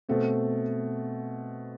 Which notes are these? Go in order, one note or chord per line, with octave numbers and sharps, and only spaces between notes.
B2 A3 C4